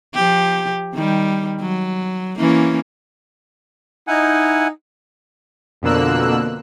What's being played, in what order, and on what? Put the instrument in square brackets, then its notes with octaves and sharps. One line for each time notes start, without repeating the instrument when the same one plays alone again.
[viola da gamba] F3 G4
D#3 G3
F#3
E3 A#3 C#4
[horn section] D#4 [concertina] E4 F#5 G#5
[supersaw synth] F2 B2 D3 A#3 E6 F#6